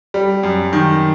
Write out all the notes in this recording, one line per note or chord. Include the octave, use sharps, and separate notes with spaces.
G3
F#2
D#3